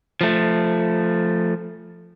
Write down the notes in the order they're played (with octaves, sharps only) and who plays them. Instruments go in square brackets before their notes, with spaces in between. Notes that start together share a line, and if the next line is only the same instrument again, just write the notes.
[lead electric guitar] F3 A3